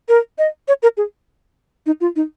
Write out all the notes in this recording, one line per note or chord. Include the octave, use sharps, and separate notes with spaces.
A#4
D#5
C#5
A#4
G#4
D#4
F4
D#4